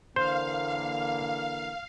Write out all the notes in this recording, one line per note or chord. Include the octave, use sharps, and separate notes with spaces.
D3 E3 A#3 C5 F5